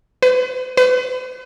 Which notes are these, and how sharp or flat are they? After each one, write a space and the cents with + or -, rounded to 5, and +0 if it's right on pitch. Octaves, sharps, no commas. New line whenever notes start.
B4 +40
B4 +40